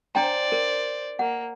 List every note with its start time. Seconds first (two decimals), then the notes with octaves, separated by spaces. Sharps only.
0.15 D4 C5 D5 G5 A#5
0.52 A#4
1.19 A#3 F#5